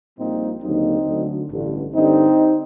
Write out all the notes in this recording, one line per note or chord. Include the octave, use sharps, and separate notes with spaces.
A#1 A#2 G3 A#3 C4 D#4
D#2 D3 F#3 A#3 C4 D#4
D2 D3 F#3 A3
A1 G2 D3
G2 D3 G3 C4 D#4